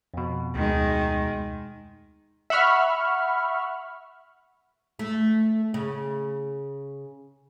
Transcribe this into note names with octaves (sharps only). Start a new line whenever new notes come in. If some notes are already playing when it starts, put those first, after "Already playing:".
F2 B2
D2 D#3 G#3
E5 F#5 B5 C#6 F6
A3
C#3